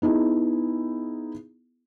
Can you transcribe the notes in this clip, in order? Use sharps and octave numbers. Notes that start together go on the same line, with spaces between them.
B3 D#4 E4 G#4